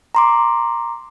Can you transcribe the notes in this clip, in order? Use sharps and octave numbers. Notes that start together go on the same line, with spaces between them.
A#5 C6 D6